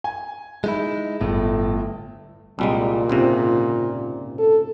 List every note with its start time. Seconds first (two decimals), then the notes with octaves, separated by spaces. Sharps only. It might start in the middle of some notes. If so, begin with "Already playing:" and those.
0.04 G#5
0.64 G#3 D#4 E4
1.21 G1 A2 A3
2.59 C2 A#2 G3 G#3
3.10 C#2 G#2 C3
4.38 A4